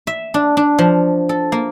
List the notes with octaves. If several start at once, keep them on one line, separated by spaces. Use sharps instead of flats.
E5
D4
D4
F3
A4
A#3